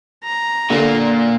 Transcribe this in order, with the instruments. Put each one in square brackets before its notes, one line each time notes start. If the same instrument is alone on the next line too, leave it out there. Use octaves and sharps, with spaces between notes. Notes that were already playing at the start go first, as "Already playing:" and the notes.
[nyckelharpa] A#5
[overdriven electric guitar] A#2 A#3 [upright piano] D3